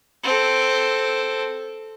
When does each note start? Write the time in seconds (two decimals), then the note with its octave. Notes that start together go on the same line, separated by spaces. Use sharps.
0.23 C4 A4